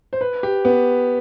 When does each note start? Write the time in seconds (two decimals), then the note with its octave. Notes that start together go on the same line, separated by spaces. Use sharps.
0.13 C5
0.21 B4
0.43 G4
0.65 B3